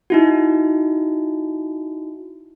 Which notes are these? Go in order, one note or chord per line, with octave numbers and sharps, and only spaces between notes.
D#4 E4 F#4